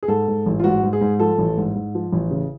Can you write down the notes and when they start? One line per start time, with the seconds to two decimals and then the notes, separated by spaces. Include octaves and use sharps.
0.03 G#4
0.08 G#2 A4
0.28 G#2
0.46 A1
0.59 F4
0.64 G#2 F#4
0.83 G#2
0.93 G#4
1.01 G#2
1.19 F3 A4
1.38 A1
1.57 G#2
1.75 G#2
1.95 F3
2.13 A1
2.31 C#3